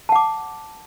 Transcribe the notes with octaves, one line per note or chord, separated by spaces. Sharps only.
F#5 A5 D6